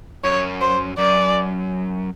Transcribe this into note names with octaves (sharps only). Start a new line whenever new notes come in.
F#2 C#5
C5
F#2 D5